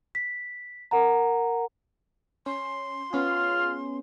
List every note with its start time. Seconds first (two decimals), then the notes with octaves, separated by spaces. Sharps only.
0.15 B6
0.91 A#4 F#5 A#5
2.46 C#4 C6
3.13 B3 C#4 F4 G#4 F6